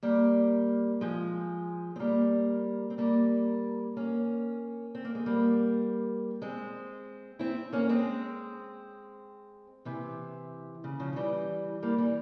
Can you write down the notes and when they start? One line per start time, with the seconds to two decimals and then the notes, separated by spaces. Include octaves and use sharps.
0.03 G3 A#3
1.01 F3 G#3
1.96 C4
1.99 G3 A#3
2.90 C4
2.98 G3 A#3
3.97 A#3 C#4
4.95 C4
5.05 A#3
5.15 G#3
5.26 G3 A#3
6.42 G#3 C4
7.39 C4 E4
7.72 A#3 C#4
7.89 G#3 C4
9.85 C3 E3
10.84 C#3
11.00 C#3 F3
11.13 F3
11.16 E3 G3
11.82 G3 A#3
11.98 E3 G3